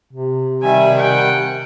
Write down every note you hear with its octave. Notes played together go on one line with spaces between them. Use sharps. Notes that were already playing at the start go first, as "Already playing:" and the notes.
C3
D#3 G3 E5 G#5
F#5 G5